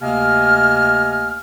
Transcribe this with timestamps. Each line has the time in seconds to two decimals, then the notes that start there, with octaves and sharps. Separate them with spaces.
0.01 D2 C3 A#3 D#5 G#5 F6